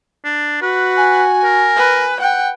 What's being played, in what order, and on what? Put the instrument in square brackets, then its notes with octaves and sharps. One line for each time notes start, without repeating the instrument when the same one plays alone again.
[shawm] D4
[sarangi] F#4 [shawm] B4
[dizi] G#5
[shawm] A#4
[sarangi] B4
[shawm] F#5 [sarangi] G5